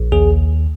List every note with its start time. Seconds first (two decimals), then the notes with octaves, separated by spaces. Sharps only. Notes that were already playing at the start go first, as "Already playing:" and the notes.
Already playing: A#1
0.12 D#2 G#4